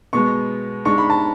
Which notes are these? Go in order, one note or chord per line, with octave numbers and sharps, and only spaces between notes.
B2 G#3 B3 C#6
G#2 G#3 D4 C#6
B5
A5